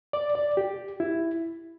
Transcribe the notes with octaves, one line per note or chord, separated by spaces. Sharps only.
D5
D5
G4
E4